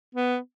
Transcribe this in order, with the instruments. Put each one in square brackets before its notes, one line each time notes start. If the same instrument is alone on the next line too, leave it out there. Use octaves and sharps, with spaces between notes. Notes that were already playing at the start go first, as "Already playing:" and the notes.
[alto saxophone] B3